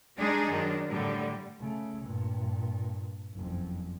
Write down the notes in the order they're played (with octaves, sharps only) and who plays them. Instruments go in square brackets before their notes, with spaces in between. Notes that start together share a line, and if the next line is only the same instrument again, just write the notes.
[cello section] G3 G#3 D4 D#4 G#4
F#2 D#3 D4
A2 D3 G3
[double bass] C#3 A3
G2 A#2
F#1 F2